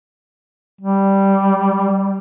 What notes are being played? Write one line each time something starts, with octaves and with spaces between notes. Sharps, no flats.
G3